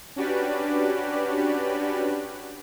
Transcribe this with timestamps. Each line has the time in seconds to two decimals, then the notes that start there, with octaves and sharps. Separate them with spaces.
0.16 C#4 D4 F#4 G4 B4 D5